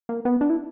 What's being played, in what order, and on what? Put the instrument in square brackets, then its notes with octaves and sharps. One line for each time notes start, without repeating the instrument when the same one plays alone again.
[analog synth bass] A#3
B3
D4
E4